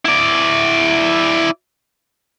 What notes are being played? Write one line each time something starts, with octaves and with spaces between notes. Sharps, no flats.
E4 D5